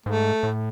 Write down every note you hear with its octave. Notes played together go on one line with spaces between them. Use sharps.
G#2 A3
A2